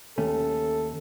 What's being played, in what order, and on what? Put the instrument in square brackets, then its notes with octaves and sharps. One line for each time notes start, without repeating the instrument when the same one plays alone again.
[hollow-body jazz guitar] D#2 A3 C#4 [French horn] A4